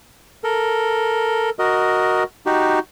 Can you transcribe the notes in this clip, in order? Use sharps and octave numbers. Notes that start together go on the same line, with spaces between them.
A4 A#4
F#4 A#4 D#5
D#4 F#4 G4